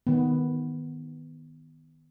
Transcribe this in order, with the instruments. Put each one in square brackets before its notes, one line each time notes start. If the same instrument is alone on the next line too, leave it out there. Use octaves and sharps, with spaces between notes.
[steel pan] D#3 B3